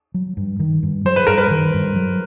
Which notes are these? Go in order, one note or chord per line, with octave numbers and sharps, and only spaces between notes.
F#3
G2
D#3
G2
F#3 C5
B4
G2 A#4
B4
D#3
G2
F#3